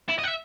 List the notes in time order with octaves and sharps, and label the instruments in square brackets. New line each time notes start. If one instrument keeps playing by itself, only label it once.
[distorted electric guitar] E4
D#5
F#5
E5